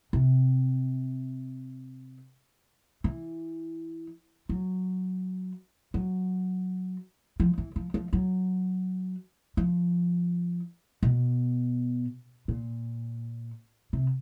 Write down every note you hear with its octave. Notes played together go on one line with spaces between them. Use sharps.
C3
E3
F#3
F#3
F3
E3
F3
F3
F#3
F3
B2
A#2
C3